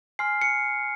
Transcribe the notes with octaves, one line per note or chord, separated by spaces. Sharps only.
G#5 C6 F6 C7
C#7